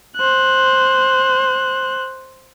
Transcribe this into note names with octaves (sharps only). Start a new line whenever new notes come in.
C5 F#6